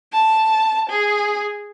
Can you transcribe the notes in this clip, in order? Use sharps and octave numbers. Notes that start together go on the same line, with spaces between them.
A5
G#4